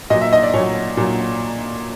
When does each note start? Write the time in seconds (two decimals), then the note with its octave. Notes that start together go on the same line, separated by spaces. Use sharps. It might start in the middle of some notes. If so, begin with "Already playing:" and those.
0.10 A#2 F#3 D#5
0.21 E5
0.33 D#5
0.43 D5
0.53 A#2 F#3 C#5
0.97 A#2 F#3